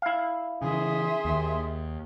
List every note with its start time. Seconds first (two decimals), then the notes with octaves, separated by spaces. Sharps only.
0.02 E4 F5
0.62 C#3 E3 G#4 E5 C6 D#6
1.25 D#2